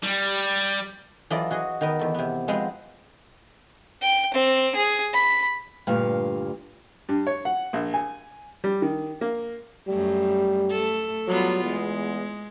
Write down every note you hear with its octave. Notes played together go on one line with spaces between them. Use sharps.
G3
E3 F#3 F4 A4 D5 D#5
F#4 G#4 D#5
D#3 B3 A#4 D#5
E2 A4
C3 B3
F3 G#3 B3 C4
G5
C4
G#4
B5
D2 G2 A#2 F5
G2
C#5
F#5
A#1
G#5
G3
D#3
A#3
F#2 G3 A3
A3 A4
F#3 G3 B3 F4
E2 G#3